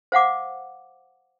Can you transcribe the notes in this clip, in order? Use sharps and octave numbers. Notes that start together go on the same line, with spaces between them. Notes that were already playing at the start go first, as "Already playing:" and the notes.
C5 F5 F#5 D6